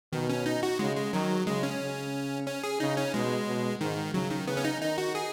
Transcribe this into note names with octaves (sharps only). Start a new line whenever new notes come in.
B2 D#3
C#4
D#4
F#4
C#3 G#3
G#3
D#3 F#3
C#3 G#3
C#4
C#3
C#4
G#4
C#3 D#4
C#4
B2 G#3
B2
G#2 D#3
C#3 F#3
D#3
C#3 B3
C#4
D#4
D#3 D#4
F#4
G#4